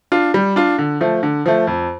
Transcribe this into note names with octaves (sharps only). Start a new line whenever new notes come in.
D4 F4
G3
D4 F4
D3
F3 A3
D3
F3 A3
F2